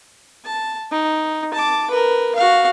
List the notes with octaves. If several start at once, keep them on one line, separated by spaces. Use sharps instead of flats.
A5
D#4
A5 D6
A#4 B4
F#4 F5